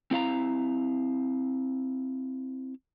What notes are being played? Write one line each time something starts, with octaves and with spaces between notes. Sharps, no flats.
C4 E4 F5 A#5